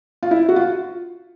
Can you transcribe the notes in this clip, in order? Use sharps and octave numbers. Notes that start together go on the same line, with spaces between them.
F4
E4
F#4
F4